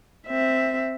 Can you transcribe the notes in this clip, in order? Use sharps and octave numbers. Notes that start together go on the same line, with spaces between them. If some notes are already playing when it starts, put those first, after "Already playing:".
C4 E5